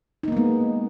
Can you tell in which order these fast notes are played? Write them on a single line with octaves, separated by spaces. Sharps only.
D#4 A#3 B3 G#3